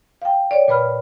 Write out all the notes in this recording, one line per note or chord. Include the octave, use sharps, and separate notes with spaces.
F5 G5
C#5 D5
A#2 B4 B5 F6